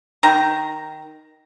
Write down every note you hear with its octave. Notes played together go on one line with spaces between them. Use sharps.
D#3 A#5